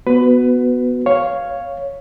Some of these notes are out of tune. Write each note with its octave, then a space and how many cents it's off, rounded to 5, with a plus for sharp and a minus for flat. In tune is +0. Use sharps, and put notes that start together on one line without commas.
B3 +0 F#4 +0 B4 +20
C#5 +0 F5 +0